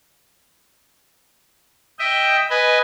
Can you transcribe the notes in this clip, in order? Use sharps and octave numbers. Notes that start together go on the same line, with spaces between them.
D#5 E5 G5
B4 D#5 G#5